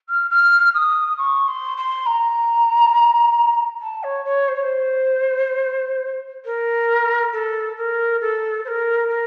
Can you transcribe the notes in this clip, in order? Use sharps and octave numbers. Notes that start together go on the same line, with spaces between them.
F6
F6
D#6
C#6
C6
C6
A#5
A5
C#5
C#5
C5
C#5
C5
A#4
A4
A#4
A4
C5
A#4
A#4